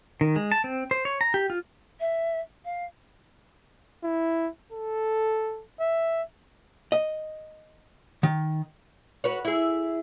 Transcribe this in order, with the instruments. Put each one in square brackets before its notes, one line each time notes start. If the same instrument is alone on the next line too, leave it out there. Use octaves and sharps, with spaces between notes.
[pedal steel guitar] D#3
G#3
A5
C4
C5
C#5
A#5
G4
F4
[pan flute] E5
F5
[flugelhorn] E4
A4
E5
[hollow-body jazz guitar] D#5
D#3
[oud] F#4 B4 C#5
E4 G#4